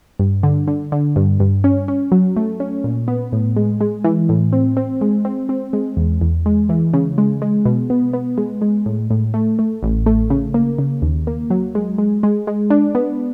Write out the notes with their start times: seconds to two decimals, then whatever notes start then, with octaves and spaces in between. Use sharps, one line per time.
0.19 G2
0.43 D3
0.68 D3
0.92 D3
1.16 G2
1.40 G2
1.64 C#4
1.88 C#4
2.12 F#3
2.37 A3
2.60 C#4
2.84 A#2
3.08 B3
3.32 A2
3.56 G#3
3.81 G#3
4.04 E3
4.29 A2
4.53 C4
4.77 C4
5.01 G#3
5.25 C4
5.49 C4
5.73 G#3
5.97 E2
6.21 E2
6.46 G#3
6.69 E3
6.94 C#3
7.18 G#3
7.42 G#3
7.65 B2
7.90 B3
8.13 B3
8.38 G#3
8.62 G#3
8.86 A2
9.10 A2
9.34 A3
9.59 A3
9.83 A1
10.06 A3
10.30 C#3
10.54 A#3
10.79 C#3
11.02 D#2
11.27 A#3
11.50 F#3
11.75 G#3
11.98 G#3
12.23 G#3
12.47 G#3
12.70 D4
12.95 B3